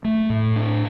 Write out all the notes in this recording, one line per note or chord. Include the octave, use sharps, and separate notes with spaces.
A3
A2
D4